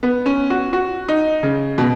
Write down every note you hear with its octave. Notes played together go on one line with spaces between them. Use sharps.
B3
C#4
F#4
F#4
D#4
C#3
B2